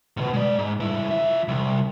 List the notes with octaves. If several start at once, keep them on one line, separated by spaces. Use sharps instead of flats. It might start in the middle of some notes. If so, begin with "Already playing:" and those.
G#2 B2
G#3 D5
G#2
G2 E4
F3 E5
C2